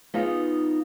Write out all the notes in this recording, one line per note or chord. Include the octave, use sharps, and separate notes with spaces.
B3 D#4 F4 G#4